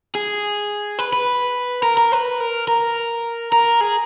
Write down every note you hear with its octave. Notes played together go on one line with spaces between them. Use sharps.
G#4
B4
B4
A#4
A#4
B4
A#4
A#4
A#4
G#4